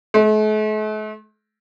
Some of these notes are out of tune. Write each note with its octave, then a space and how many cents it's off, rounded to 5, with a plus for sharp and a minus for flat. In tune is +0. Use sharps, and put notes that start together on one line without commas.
A3 -45